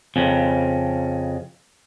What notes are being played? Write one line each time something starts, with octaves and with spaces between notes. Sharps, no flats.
F2 C#3